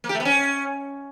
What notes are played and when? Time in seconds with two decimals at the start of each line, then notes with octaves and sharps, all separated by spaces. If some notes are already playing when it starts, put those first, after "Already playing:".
0.04 A#3
0.09 G4
0.15 A3
0.20 B3
0.25 C#4